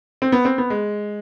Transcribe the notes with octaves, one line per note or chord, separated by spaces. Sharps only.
C4
B3
C4
B3
G#3